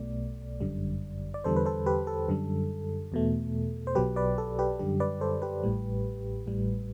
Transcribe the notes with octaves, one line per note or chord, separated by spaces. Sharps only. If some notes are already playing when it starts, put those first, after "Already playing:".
Already playing: B1 B2 A3 D5
G1 F#2 D3 G3
D5
E2 D3 G3 A4 C5
B4
A4 C5
G4 B4
A4
F#2 D3 G3
E2 B2 A3
C5
B1 B2 F#3 G4 B4
B4 D5
A4
G4 B4
F#2 D3 G3 G4
B4 D5
A4 C5
G4 B4
A1 A2 G3
A1 A2 G3